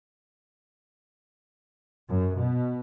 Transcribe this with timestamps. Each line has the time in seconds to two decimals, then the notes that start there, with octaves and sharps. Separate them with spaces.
2.09 F#2
2.39 B2